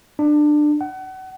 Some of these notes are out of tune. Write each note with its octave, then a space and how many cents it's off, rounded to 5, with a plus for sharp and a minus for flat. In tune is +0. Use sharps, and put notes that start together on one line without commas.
D4 +20
F#5 +35